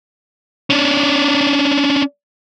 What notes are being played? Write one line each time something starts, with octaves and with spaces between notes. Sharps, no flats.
C#4 D4